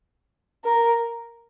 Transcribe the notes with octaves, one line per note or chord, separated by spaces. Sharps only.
A#4